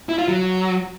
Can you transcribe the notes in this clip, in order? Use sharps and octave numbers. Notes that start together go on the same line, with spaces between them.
E4
F4
F#3